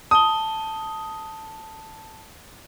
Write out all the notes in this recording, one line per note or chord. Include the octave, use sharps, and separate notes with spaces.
A5 D#6 G7